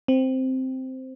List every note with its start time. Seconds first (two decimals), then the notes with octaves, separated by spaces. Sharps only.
0.08 C4